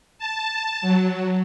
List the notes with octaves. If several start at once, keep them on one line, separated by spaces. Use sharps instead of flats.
A5
F#3